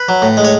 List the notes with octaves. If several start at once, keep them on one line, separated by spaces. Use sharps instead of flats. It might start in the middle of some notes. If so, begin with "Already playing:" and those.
Already playing: B4
F#3
A2
G#3
C#5